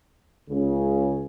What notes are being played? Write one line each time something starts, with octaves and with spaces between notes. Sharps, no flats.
C#2 C#3